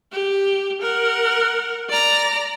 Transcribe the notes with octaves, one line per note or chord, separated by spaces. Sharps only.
G4
A#4 F#5
D5 A#5